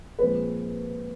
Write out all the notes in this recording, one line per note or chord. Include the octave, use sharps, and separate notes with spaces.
A#2 F3 G#3 C4 B4